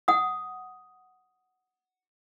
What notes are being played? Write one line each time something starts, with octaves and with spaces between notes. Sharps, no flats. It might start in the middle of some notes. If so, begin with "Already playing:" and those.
F#5 D#6